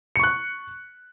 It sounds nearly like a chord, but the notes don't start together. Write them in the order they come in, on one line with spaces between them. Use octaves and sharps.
C#7 C#6 F#6